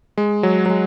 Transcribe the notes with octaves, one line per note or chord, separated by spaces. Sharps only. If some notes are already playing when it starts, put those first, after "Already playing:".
G#3
F#3
F#3
G#3